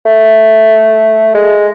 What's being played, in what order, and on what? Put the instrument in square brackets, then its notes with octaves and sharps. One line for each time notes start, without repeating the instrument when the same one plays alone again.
[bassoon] A3
G#3